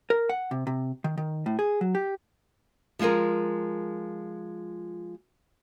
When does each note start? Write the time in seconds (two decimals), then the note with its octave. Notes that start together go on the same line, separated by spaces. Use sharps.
0.10 A#4
0.29 F#5
0.51 C3
0.67 C3
1.04 D#3
1.18 D#3
1.46 A2
1.59 G#4
1.81 F#3
1.95 G4
2.99 F3 G#3 F4 G#4 A#4